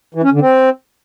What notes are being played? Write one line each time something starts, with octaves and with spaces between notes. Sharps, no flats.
E3
C#4
D3
C4